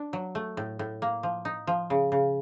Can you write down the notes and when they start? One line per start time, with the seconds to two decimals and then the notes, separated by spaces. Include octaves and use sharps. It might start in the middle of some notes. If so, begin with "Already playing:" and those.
Already playing: D4
0.13 F#3
0.35 A3
0.57 A2
0.79 A2
1.02 A#3
1.23 F3
1.45 D#4
1.67 F3
1.90 C#3
2.12 C#3